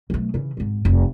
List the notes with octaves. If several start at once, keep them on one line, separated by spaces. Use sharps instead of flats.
B1 A3
C#3 E3
G#1 G#2
F1 F2